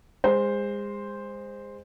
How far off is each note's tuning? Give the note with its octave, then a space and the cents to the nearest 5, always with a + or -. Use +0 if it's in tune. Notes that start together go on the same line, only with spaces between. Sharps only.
G#3 -30 C5 +0